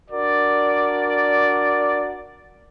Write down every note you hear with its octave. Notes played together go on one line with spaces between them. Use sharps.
D4 F#4 A#4 D5